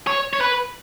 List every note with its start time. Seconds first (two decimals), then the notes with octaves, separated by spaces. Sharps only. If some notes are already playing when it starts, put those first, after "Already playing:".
0.07 C#5
0.33 C#5
0.41 B4